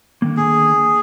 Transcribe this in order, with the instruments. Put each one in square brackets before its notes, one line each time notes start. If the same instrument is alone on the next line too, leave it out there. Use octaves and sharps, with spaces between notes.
[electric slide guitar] D3 D#3 A#3
[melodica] G#4